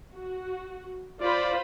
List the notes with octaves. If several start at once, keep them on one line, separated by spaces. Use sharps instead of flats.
F#4
F4 C5 D5 B5